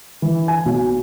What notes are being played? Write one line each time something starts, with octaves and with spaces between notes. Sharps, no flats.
E3
G#5
B1